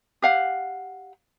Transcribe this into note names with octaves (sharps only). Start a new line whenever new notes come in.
G4 F5 F#5